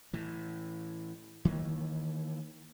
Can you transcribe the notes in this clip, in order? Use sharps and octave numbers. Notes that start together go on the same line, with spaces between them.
A2 E3
D#3 E3 A#3